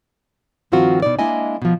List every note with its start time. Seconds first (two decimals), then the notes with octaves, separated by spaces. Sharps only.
0.72 G2 D#3 F3 C4 F4 F#4
1.02 B2 D#4 D5
1.19 G#3 A#3 D4 E4 D#5 G#5
1.62 B2 F3